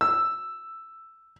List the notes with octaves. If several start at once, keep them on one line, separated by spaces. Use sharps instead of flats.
E6